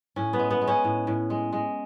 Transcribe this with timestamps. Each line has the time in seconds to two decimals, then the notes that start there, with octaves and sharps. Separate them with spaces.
0.16 A2 C#4
0.33 B3
0.39 G#3
0.50 B3
0.61 G#3
0.67 C#4
0.84 A2
1.07 A2
1.30 G#3
1.52 G#3